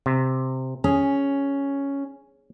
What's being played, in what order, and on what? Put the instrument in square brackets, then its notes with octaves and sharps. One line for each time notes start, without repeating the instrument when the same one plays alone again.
[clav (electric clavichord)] C3
[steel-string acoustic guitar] C#4 [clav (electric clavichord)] G#4